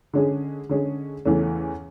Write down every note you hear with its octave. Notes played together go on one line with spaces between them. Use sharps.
D3 G#3 C#4 G#4
D3 G#3 C#4 G#4
E2 C#3 E3 A3 C#4